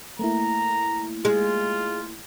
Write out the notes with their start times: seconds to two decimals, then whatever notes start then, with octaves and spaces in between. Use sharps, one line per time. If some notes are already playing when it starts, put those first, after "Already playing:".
0.19 A3 A#3 E4 A#5
1.25 G#3 F4